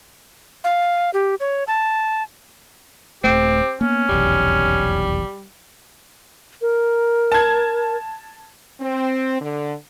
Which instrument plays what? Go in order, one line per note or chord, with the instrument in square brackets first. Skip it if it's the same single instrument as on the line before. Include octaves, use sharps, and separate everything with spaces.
[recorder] F5
G4
C#5
A5
[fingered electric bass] D#1 C2 A3 [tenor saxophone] C4 [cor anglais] G4
[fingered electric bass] A#3 B3 [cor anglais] C#4
[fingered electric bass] F1 B1 E2 [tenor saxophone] G3
[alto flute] A#4
[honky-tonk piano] A5 G#6
[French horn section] C4
D3